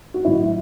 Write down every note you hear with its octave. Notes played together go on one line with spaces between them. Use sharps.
F#4
A2 F#3 E4